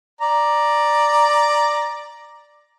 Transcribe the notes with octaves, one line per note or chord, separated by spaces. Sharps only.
D5 A#5